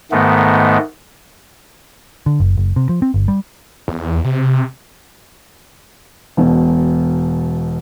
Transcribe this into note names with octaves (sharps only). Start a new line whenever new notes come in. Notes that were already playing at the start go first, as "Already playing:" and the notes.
G#2 D#3 A3 B3
D3
F#1
F#1
C3
F3
C4
G1
G3
E2
C3
E1 B2